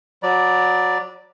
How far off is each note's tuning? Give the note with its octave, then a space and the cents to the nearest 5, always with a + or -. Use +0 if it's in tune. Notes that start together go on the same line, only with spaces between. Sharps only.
F#3 -20 D5 +0 B5 -45